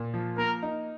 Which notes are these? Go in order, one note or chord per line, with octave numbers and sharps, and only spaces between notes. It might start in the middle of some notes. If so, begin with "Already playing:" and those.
Already playing: A#2
F3
A#3 A#4
D#4